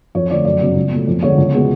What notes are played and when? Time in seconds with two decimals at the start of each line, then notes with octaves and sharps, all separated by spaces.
0.15 F2 C#5
0.30 D3 F3 A3 D5
0.45 F#2 D5
0.61 C#3 F#3 B3
0.76 C#2
0.92 B2 F#3 A3
1.07 F2
1.23 D3 G#3 B3 C#5
1.37 C#2
1.54 B2 G#3 B3